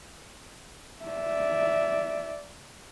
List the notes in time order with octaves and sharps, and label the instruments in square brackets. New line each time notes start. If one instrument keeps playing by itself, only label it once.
[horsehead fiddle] D5 E5